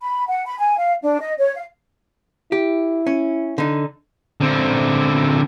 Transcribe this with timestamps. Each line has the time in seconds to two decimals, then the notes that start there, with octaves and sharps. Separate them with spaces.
0.01 B5
0.28 F#5
0.46 B5
0.59 G#5
0.78 F5
1.02 D4
1.21 D#5
1.38 C#5
1.56 F5
2.52 E4 G4
3.07 C#4
3.58 D3 D#4
4.41 D3 C4